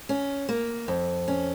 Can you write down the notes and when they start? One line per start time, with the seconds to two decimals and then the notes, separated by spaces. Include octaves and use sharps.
0.09 C#4
0.49 A#3
0.88 F2
1.28 C#4